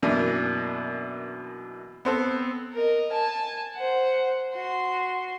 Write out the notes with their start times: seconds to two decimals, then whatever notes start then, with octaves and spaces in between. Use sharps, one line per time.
0.03 F#2 B2 E3 A#3 D4
2.05 B3 C4 A4
2.73 A#4 D#5
3.12 G#5 A5
3.76 C5 F#5
4.55 F#4 C6